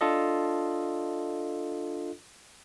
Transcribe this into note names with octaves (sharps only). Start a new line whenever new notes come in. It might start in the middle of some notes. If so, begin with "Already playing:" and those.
D4 F4 A4 D#5